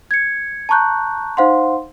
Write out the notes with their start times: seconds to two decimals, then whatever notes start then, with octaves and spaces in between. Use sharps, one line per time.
0.11 G#6 C#7
0.69 A5 A#5 C#6 F#6 G6
1.37 D#4 C5 F5 F#5 C6